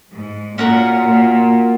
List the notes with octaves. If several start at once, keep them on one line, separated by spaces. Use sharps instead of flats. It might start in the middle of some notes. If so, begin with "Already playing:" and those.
G#2
A#2 C#4 F#4 A#4
A#2